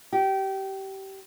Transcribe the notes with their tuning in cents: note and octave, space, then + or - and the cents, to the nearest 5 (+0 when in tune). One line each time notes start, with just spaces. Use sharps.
G4 -25